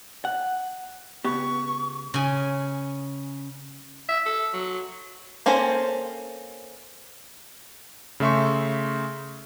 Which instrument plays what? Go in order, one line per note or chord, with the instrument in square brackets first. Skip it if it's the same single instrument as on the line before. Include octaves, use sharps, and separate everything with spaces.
[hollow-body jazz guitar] F#5
[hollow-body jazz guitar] C#2 B3 G4 [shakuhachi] C#6
[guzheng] C#3 G#5
[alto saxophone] E5
A4
F#3
[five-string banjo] A#3 C4 C#4 A4 C5
[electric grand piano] C#3 A3 E5 C6 C#6